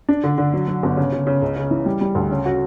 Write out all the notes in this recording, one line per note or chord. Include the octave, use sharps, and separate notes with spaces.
D4
D3
D3
F#3
F#3
G1
C#3
C#3
C#3
C#2
C#3
E3
G3
G3
D2
C#3
F#4